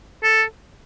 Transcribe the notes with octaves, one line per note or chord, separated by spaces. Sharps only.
A4